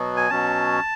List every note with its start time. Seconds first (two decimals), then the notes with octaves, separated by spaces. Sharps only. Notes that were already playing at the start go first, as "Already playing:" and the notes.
Already playing: B2 F#3 B3
0.17 G#5
0.30 B2 F#3 C#4 A5